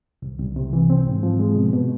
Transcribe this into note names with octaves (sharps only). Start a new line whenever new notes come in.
C2
C2
C3
E3
C4
G#2
F3
G#3
B2
B2